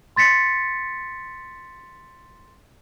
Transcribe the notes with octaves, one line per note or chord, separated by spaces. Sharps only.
C6 A6 B6 C#7